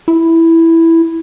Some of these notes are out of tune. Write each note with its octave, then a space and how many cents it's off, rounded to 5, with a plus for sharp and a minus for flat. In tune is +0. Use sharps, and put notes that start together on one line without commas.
E4 +0